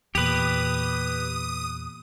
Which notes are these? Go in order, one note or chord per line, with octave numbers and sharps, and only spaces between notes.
E2 A#2 G4 B4 D#6